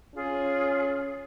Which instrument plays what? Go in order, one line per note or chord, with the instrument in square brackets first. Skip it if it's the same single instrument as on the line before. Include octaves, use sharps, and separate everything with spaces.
[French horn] C#4 [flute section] F4 G#4